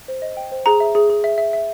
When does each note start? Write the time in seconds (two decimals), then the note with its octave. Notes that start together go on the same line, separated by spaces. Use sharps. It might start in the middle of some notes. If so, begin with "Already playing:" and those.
0.08 C5
0.22 D#5
0.37 G5
0.52 C5
0.66 G#4 A#5
0.80 E5
0.95 G#4
1.10 G#4
1.24 E5
1.38 E5
1.53 E5